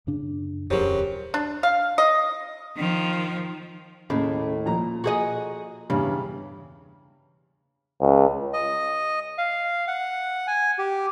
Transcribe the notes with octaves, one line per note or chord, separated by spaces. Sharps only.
F#2 C#3 D4
D#1 F2 C#3 F#3 G4 A#4 C5
D4
F5
D#5
D#3 F3
D#2 A2 C#3
A#2 F3 A#5
F#4 G#4 D#5
E2 G2 C#3
C#2
D#5
F5
F#5
G#5
G4